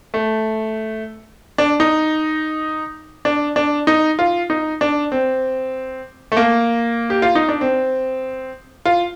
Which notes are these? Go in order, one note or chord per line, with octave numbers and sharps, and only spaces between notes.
A3
D4
D#4
D4
D4
D#4
F4
D#4
D4
C4
A3
A#3
G4
F4
D#4
D4
C4
F4